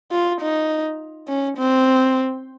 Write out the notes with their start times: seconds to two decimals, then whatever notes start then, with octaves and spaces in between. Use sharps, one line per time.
0.12 F4
0.41 D#4
1.28 C#4
1.57 C4